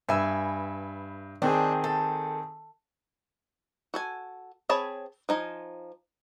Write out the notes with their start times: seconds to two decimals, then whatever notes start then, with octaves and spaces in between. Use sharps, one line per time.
0.09 G2 B4 E5 G#5 E6
1.42 D#3 C4 D4 G#4
1.84 A4
3.94 F#4 A4 G#5
4.69 C4 G#4 C#5 A5 B5
5.29 F3 D#4 G#5